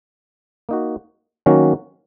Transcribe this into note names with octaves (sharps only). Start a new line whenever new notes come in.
A#3 D#4 F#4
D#3 F#3 A#3 C#4 F#4